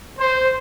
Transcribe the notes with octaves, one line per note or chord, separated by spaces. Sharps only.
C5